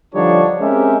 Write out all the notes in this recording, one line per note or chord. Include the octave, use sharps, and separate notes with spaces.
D3 F3 G3 D4 D#4 C#5
G#3 C4 C#4 G4 A#4 E5